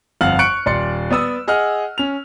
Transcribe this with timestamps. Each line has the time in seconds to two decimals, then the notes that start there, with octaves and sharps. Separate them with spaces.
0.21 G1 F2 F5 F#5 F6 F#7
0.39 C#6 F#6 C#7 D7
0.66 D#1 D5 C6 C#7
1.10 B3 D5 D#6 E6
1.48 G#4 D#5 F#5 F6
1.98 C#4 F7